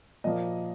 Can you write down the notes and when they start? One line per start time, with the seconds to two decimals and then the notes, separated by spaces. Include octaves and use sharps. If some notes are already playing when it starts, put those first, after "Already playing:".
0.24 A#2 F3 A#3 D#5